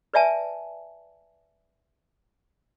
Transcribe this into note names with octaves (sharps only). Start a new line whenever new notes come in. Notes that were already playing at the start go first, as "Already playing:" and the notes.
B4 D5 E5 G#5 A5